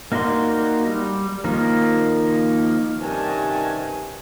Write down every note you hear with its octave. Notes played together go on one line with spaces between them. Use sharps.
A#3 D#4 F#4 D5 C6
G3
D#3 F3 A#3 D#4
G2 C3 D#3 C#4 G#5 A5